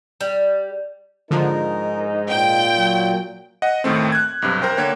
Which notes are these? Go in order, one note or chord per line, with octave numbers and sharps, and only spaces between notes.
G3
G#2 D3 F3 D#4 A#4
A#2 G5
F#3
D#5 F#5
D#2 A2 D#3 A3 C4
F#6 G#6
B1 G2 C3
A#4 C5 G5
D3 A#3 C#5 G5